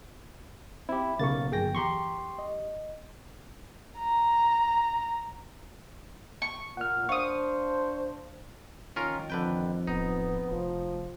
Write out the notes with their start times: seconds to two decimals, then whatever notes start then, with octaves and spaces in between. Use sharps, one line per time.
0.89 C4 E4 G4
1.19 B1 C#3 A#3 C#6 A6
1.52 G1 F#3 G#4 G5 A#6
1.75 E2 G4 A#5 C6 C#6
2.39 D#5
3.98 A#5
6.42 C#6
6.77 A#2 F#5 F6
7.09 D4 C5 F5 C#6 D#6
8.96 D#3 C#4 F4 A#4
9.30 F2 D3 B4 G5
9.87 D1 B3 D#4
10.51 F1 F3